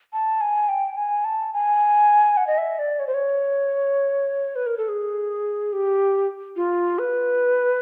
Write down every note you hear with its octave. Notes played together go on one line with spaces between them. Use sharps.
A5
G#5
G5
G#5
A5
G#5
F#5
D#5
E5
D5
C#5
C5
C#5
B4
A#4
A4
G#4
G4
F4
B4